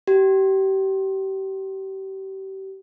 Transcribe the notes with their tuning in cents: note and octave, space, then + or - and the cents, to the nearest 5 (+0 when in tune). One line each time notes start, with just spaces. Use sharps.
G4 -30